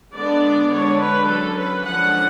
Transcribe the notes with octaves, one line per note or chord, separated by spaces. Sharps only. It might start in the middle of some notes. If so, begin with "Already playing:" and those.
D3 G#3 B3 D4 D5
D3 G#3 D4 C#5
B4
F#3 C#4 A4
B4
D3 F3 G#3 C#4 F#5